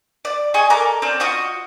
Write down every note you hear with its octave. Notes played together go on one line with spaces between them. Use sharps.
D5
G#4 D#5 G#5 C#6
A4 A#4 D6
C4 C#4 C5 D5
F4 F#4 D#5 C#6